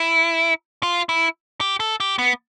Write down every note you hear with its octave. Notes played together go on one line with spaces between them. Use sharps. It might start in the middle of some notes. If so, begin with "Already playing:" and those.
Already playing: E4
F4
E4
G4
A4
G4
B3